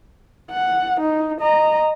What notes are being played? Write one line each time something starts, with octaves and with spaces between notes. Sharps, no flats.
F#5
D#4
D#5 A#5